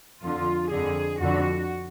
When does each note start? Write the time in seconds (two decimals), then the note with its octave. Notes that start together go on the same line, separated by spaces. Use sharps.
0.22 F2 D3 F4
0.71 F2 D3 G#4
1.20 F2 D3 F#4